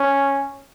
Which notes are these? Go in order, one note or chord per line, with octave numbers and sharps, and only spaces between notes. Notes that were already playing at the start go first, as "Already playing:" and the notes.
Already playing: C#4